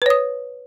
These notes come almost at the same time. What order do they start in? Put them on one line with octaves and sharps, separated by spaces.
B4 C#5 D#6